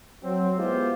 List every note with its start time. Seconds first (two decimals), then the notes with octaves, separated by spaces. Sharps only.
0.23 F#3 C4
0.57 G#3 B3 E4 F4 G4 C5